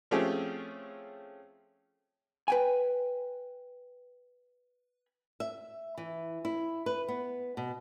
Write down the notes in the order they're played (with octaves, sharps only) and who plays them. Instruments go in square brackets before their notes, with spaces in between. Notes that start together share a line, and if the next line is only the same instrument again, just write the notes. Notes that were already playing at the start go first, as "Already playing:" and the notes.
[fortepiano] F3 A3 C4 C#4 G4 G#4
[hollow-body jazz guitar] B4 G5 G#5
[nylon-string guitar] E5
E3
E4
B4
B3
B2